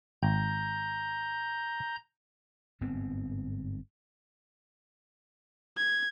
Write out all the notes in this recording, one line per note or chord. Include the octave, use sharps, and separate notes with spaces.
G#1 G5 A#5 G6
G1 G#2 B3 C4
G#6